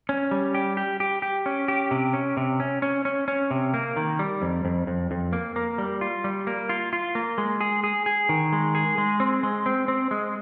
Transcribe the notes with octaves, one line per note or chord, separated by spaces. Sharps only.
C#4
G3
G4
G4
G4
G4
C#4
G4
C3
C#4
C3
C#4
C#4
C#4
C#4
C3
A#3
D#3
G3
F2
F2
F2
F2
A#3
A#3
G3
F4
G3
A#3
F4
F4
A#3
G#3
G#4
G#4
G#4
D#3
G#3
G#4
G#3
C4
G#3
C4
C4
G#3